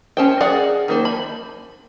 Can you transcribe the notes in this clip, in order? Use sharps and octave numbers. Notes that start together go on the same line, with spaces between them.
C#4 C5 G5
G#4 A#4 D5 F#5
D#3 A#3 C5
B5